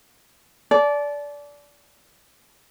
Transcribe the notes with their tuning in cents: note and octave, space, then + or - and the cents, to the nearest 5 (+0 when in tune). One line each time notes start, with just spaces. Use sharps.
D5 -20 A5 -35